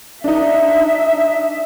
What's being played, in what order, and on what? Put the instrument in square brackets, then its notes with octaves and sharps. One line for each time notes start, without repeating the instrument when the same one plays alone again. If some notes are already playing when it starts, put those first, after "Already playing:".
[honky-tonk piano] D4 D#4 [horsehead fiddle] E5